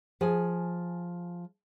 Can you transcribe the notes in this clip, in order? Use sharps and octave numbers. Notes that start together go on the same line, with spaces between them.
F3 G#4 G#5